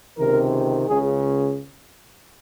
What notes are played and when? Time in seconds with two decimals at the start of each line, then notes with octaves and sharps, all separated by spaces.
0.17 C#2 C3 D#3 A#4
0.88 C#2 C#3 G#4